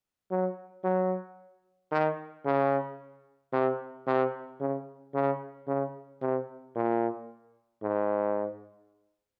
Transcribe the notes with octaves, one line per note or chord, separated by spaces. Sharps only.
F#3
F#3
D#3
C#3
C3
C3
C#3
C#3
C#3
C3
A#2
G#2